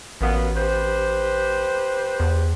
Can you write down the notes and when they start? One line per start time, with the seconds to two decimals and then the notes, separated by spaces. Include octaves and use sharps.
0.21 A1 F#3 A#3 B3
0.55 G4 B4 C5
2.20 E2